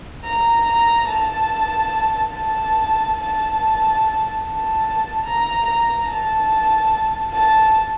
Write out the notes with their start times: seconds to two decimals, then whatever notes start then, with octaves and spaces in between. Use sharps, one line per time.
0.24 A#5
0.67 A#5
1.09 A5
2.33 A5
3.17 A5
4.42 A5
5.25 A#5
5.66 A#5
6.08 A5
7.33 A5